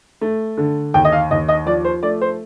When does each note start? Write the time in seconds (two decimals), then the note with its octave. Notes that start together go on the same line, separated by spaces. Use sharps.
0.21 A3
0.57 D3
0.94 D#2 G5
1.05 D#5
1.12 F5
1.31 D#2 D#5
1.49 D#5
1.66 F3 D5
1.85 C5
2.03 A3 D5
2.21 C5